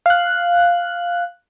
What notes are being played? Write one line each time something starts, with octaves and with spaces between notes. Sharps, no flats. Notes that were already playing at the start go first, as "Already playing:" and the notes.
F5 F#6